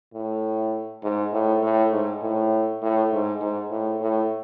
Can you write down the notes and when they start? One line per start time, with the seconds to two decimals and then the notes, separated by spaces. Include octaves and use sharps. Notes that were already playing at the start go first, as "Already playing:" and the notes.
0.14 A2
1.03 G#2
1.32 A2
1.62 A2
1.92 G#2
2.22 A2
2.82 A2
3.12 G#2
3.41 G#2
3.70 A2
4.00 A2